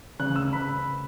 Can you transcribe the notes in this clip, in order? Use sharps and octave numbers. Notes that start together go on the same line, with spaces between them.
C#3 F#6
E6
C#3
B5